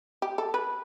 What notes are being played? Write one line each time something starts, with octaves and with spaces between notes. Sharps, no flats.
G4
A4
B4